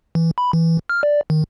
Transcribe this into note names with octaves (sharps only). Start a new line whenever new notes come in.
E3
B5
E3
F6
D5
D#3